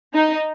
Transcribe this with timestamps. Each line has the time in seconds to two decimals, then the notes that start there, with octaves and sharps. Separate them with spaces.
0.14 D#4